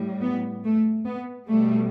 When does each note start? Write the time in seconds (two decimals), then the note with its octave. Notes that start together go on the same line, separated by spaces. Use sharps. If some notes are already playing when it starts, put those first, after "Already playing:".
Already playing: A2 G3
0.22 B3
0.64 A3
1.05 B3
1.48 B2 G3 A3